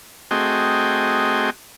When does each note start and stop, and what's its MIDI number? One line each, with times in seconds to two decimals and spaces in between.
0.31 1.50 57
0.31 1.50 60
0.31 1.50 66
0.31 1.50 68
0.31 1.50 75
0.31 1.50 79